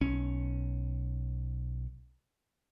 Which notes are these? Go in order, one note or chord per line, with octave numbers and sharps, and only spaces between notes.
B1 C#4